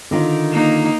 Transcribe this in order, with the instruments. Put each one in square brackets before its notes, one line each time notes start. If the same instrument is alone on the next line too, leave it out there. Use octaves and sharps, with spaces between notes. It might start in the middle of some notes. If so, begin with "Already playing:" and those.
[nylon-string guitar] D3 D#3 F4
[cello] A#3 D#4